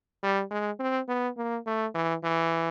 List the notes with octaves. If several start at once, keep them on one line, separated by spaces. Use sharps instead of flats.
G3
G#3
C4
B3
A#3
A3
E3
E3